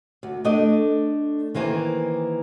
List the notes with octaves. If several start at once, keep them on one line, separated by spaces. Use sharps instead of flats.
D2
A3 D4 D5 D#5
D#3 E3 A#3 C5 G#5